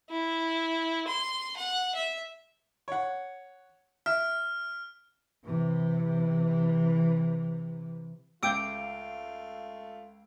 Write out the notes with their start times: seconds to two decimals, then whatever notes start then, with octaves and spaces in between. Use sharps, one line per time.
0.10 E4
1.07 C6
1.57 F#5
1.95 E5
2.88 C#5 F#5
4.06 E5 F6
5.44 C3 E3
8.43 C#2 A3 F4 G5 D6 E6 D7